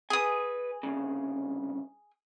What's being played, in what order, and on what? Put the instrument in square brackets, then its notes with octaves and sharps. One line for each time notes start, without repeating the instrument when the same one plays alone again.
[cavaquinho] G#4 D#6 [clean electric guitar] B4 G#5
[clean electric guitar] C2 G2 C#3